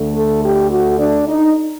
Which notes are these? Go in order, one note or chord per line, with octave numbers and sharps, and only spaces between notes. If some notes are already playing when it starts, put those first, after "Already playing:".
Already playing: D2 D3 A3
A4
G4
F#4
D4
D#4